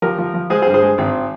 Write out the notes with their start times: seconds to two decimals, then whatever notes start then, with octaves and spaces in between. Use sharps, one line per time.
0.02 F3 G4 A#4
0.18 F3
0.34 F3
0.50 G#3 G#4 C5
0.62 G#4 C5
0.67 G2
0.74 G#4 C5
0.82 G#3
0.98 G#1 C4